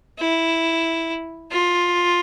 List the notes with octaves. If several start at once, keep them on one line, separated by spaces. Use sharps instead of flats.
E4
F4